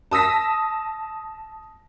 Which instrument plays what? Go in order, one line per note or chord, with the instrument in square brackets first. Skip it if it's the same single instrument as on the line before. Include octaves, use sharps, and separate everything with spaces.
[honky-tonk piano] A5 D#6 E6 A#6 B6